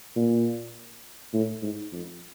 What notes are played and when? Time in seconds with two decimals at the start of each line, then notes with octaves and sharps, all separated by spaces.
0.16 A#2
1.33 A2
1.62 G#2
1.92 F2